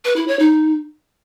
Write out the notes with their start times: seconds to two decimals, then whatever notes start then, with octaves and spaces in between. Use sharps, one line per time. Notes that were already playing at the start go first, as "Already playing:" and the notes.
0.04 B4
0.16 E4
0.28 C#5
0.39 D#4